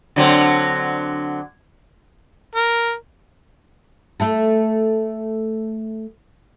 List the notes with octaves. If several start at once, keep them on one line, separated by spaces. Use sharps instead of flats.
D3 F#3 C4
A#4
A3 E4 A4